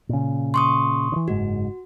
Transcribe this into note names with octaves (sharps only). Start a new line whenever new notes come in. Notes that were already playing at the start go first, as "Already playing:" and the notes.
A#2 C#3
C6 C#6 D#6
D3 E3
F#1 G#2 F#4